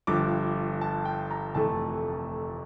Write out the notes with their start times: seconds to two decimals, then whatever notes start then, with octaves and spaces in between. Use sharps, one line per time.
0.07 G1 G2 F3 D6
0.81 A5
1.05 G5
1.31 A#5
1.55 F1 F2 E3 A3 A5